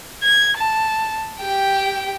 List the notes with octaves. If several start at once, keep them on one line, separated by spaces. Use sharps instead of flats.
G#6
A5
G4 G5